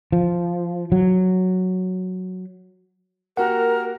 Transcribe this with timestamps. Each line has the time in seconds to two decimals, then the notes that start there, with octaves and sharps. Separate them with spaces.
0.12 F3
0.92 F#3
3.37 A#3 F#4 G4 A#4 F#5